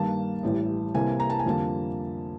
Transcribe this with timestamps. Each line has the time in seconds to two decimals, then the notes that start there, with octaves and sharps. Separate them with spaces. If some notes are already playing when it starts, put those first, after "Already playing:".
Already playing: G2 D#3 G3 A#3 A5
0.43 A1 A2 E3 G3
0.94 C2 C3 E3 G3 A#3 G#5
1.20 A#5
1.30 A5
1.39 G#5
1.46 F2 D3 G3 A#3 A5